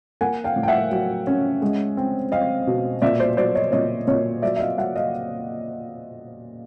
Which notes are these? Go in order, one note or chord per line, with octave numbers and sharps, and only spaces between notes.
A#3 F#5 G#5
F5 G5
A2
G5
E5 F#5
F#3
C#4
G#3
C4
C4 D#5 F5
B2
A#2 D5 E5
C5 D5
F#3 C5 D5
C#5 D#5
A#2 C#5 D#5
A#2 C#5 D#5
F#3 D5 E5
E5
D#5 F5
F#3 E5 F#5
D#5 F5